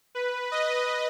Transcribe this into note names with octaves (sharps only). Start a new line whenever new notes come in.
B4
D#5